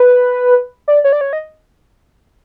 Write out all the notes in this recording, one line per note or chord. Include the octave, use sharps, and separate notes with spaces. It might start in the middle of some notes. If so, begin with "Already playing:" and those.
Already playing: B4
D5
C#5
D5
C#5
D#5